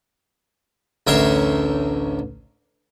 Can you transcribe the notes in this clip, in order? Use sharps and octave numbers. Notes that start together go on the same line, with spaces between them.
A1 D2 A#4 C#5 E5 C6